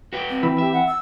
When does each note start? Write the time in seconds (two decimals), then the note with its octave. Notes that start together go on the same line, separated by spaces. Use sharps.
0.13 F#4 B4 G5
0.29 C4
0.43 E3 B5 E6
0.58 G4 E5
0.72 F#5
0.87 E6